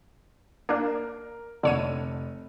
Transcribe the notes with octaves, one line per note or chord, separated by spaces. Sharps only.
A#3 D4 A#4
F1 D3 C#5 D#7